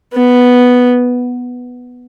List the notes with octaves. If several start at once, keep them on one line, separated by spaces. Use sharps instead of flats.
B3